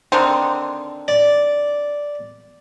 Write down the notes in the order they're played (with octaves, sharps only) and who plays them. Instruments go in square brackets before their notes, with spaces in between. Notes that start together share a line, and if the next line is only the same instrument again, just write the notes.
[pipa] D3 D#3 C4
[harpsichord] D5